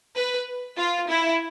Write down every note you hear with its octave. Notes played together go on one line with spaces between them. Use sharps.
B4
F4
E4